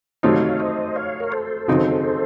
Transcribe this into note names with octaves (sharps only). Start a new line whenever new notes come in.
C3 F#3 A3 C4 D#4 C#5 F5
C5 D#5
C#5 F5
A#4
A4 C5
C#3 F#3 C4 D#4